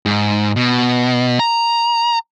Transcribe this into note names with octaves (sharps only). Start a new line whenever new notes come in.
G#2
B2
A#5